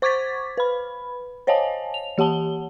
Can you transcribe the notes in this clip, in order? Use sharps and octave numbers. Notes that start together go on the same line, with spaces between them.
C5 C#6 D6 G#6 A6 B6
B4 B5
C5 C#5 D#5 F5 G#5 A5
F7
E3 G4 F#5 A5 G7